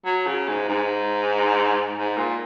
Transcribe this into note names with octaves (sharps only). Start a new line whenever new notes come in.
F#3
C#3
G#2
G#2
G#2
A#2